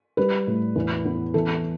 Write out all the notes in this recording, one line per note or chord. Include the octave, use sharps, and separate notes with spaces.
G3 B4
A2
E2
B3
E3 A4